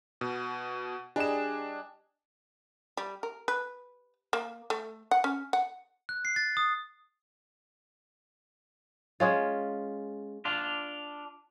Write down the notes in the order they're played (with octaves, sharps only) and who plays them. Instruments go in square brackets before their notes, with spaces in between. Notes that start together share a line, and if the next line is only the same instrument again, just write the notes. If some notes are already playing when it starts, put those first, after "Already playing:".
[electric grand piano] B2
[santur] G3 G#4 D#5 [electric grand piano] D4 E7
[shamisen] G3
A#4
B4
A#3
A3
F#5
C#4
F#5
[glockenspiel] F#6
C7
A6
D#6
[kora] G#3 C#4 F4
[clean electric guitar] D4 F4